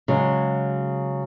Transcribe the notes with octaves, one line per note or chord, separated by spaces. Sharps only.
C#3 F#3 G#3